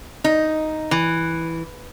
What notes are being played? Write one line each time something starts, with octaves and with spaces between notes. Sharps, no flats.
D#4
E3